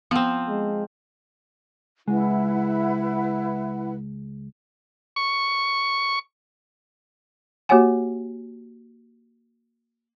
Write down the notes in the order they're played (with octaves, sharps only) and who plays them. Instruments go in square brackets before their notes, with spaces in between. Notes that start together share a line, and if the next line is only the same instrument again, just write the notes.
[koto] F3 C4 [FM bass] B3
[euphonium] G#3
[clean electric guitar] C#2 G#3 [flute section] E4 B4 F#5
[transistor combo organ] C#6
[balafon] A#3 F#4 G4 C#5 F#5 G#5